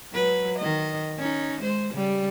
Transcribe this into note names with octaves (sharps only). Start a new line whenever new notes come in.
F#3 B4
D#3 D#5
C#4 D#4
G#3 C5
C#3 G3